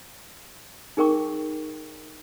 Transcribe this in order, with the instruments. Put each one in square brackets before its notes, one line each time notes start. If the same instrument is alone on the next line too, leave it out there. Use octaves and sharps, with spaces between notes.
[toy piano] D#4 G#4 A#4 G5 C#6 D6